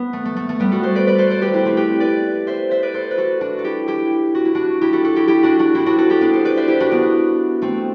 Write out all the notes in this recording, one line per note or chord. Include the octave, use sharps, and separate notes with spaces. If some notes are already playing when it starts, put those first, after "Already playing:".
Already playing: B3
A3
A3
A3
A3
G3 B3
F#4 A4
A4 C5
B4 D5
B4 D5
A4 C5
A4 C5
G4 B4
C4 E4
A3 C4
G4 B4
B4 D5
C5 E5
C5 E5
B4 D5
A4 C5
B4
F#4 A4
D4 F#4
A4
E4 G4
E4 G4
F#4
E4
D4 F#4
E4 G4
F#4 A4
F#4 A4
E4 G4
E4 G4
D4 F#4
D4 F#4
C4 E4
D4 F#4
F#4 A4
E4 G4
B3 D4
A4 C5
B4 D5
C5 E5
E4 G4
D4 F#4
B3 D4
A3 C4